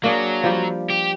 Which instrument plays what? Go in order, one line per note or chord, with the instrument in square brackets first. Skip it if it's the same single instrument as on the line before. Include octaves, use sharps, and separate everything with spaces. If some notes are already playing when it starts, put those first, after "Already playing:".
[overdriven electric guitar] F#3 [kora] A#3 D4 G#4
[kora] F3 G3 G4
[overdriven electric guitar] G4